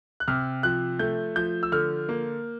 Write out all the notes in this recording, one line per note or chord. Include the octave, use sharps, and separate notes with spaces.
F#6
C3 F6
F3 F#6
A3 G6
F3 G6
E6
D3 F6
A#3